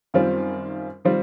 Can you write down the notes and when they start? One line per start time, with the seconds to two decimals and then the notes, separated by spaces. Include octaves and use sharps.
0.14 F#2 D#3 G3 C4 F4
1.05 D#3 G3 C4 F4